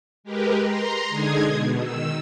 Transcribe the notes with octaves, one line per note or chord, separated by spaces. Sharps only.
G#3 G4 A#4 B4
A#5 C6
D3 G#3 D#4 G#4 D#6 G#6
B2
D#3 E6